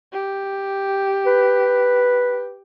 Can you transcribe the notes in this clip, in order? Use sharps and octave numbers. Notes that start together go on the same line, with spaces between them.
G4
B4